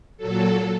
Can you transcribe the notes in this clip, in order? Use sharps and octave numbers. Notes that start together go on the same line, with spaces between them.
A#2 F#3 A4